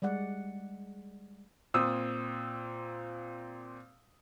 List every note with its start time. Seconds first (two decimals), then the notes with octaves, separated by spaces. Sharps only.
0.02 G3 G#3 D5 F#5
1.74 A#2 C4 D#6 E6